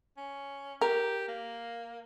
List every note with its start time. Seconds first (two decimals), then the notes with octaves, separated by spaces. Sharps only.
0.17 C#4
0.81 G4 A#4
1.28 A#3